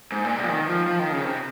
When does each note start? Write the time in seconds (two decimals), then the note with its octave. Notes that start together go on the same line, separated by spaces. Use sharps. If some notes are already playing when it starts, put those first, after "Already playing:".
0.12 G#2
0.24 A#2
0.38 C3
0.43 F3
0.49 D#3
0.69 F3
0.87 F3
0.99 D#3
1.12 C#3
1.24 C3